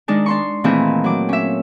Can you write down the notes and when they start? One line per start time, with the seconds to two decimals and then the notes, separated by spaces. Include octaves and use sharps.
0.08 D#3 G#3 D4 D#4
0.26 D4 C6 C#6
0.64 A#2 D#3 E3 A3 C4 G#4
1.04 F#3 D6
1.29 C#4 E5